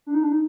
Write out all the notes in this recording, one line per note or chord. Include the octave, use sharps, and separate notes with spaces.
D4
D#4
D4
D#4